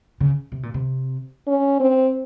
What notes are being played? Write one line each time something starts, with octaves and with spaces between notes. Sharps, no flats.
C#3
C3
A#2
C3
C#4
C4